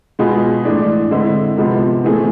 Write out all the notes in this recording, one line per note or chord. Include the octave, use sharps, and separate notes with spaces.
B2 G#3 B3 F4 G#4
A2 E3 G#3 D4
D3 G#3 C4 E4
C3 F3 G#3 B3
A2 E3 A3 C4 G#4